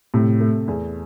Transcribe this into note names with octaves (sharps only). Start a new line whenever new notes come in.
A2 C3
A3
E2